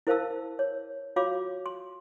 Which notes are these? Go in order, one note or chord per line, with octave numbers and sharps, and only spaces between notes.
E4 A#4 C5 F5 A5 E6
C#5
F4 F#4 C#5 F5 B5 D6
C6